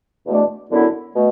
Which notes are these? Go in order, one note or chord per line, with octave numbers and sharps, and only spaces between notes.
E2 B2 A3 D4
F#2 D3 B3 E4
B2 A3